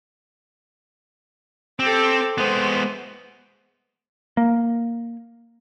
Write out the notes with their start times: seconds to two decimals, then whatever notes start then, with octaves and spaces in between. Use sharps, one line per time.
1.80 C4 G4 A4
2.38 G#3 B3 C5
4.37 A#3